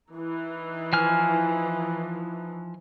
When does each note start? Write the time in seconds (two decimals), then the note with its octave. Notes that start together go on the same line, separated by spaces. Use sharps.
0.11 E3 D#4
0.93 F3 G#5 F6